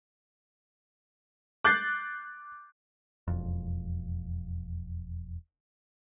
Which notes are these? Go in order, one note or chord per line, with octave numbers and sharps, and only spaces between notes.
D6 F#6 G6 A6 C7
E1 F2